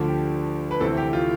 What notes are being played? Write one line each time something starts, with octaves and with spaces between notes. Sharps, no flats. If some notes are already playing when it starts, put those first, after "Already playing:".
Already playing: D2 D3 F3 A3 D4
G4
B4
D2 C3 E3 A3 C4 A4
G4
F4